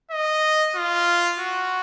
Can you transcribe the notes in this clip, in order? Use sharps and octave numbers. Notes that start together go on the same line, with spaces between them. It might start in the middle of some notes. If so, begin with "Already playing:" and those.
D#5
F4
F#4